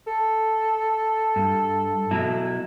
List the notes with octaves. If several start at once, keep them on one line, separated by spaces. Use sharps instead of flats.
A4
G2
B2 F#3 E4